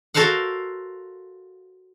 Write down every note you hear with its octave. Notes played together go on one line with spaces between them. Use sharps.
F#4 A4 A#4 C5 F5 F#5